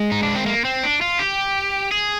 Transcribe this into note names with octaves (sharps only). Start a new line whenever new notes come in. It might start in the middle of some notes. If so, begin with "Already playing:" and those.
Already playing: G#3
D#4
D4
C4
A#3
C4
D4
F4
G4
G#4